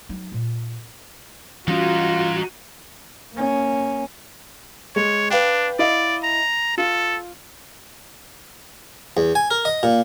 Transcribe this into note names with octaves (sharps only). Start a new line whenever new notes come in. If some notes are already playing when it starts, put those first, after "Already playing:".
F#3 D#4
A#2
E3 G3 G#3 C#4 D#4 F4 F#4
A#3 C#4
G#3 C#5
D4 B4 F5 G5
E4 D5 D#5 F5
A#5
F4 A4
E2
G#5
A#4
D#5
A#2